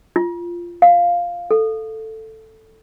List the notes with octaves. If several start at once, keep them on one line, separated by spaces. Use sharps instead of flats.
F4
F5
A4